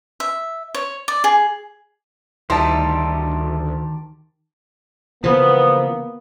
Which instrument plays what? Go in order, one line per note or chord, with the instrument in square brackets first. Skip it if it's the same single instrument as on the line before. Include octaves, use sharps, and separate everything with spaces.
[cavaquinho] E5
C#5
D5
G#4
[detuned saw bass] D2 [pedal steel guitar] D#3 G4 [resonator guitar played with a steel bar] G3 D#4 E4 [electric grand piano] A5 C6
[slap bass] C#3 E3 [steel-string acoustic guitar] F3 [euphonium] A#3 [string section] B3